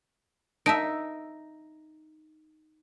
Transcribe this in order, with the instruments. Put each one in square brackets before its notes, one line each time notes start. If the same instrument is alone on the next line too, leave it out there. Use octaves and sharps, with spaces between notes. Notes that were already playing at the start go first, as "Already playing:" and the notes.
[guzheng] D#4 E5 [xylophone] A5 D7